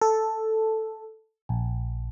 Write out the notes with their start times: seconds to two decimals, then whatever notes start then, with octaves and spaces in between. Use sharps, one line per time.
0.02 A4
1.49 A#1